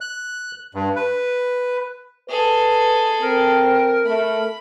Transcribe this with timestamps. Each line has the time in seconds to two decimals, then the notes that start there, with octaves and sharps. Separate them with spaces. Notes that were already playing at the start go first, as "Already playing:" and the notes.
0.01 F#6
0.75 G2
0.96 B4
2.29 G#4 A4 B4
3.21 C4 A#4
4.05 A3 B5